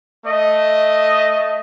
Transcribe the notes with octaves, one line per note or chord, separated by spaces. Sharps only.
A3 D#5